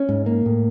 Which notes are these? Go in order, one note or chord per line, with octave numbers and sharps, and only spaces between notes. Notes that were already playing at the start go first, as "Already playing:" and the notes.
Already playing: C#4
G#2
A#3
A2